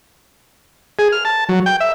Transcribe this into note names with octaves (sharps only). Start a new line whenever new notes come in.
G#4
F6
A5
F#3
G5
E5